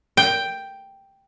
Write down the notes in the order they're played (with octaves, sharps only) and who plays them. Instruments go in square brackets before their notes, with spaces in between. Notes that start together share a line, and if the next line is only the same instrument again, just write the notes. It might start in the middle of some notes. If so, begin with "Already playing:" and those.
[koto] G5